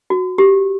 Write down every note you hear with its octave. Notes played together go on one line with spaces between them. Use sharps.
F#4
G4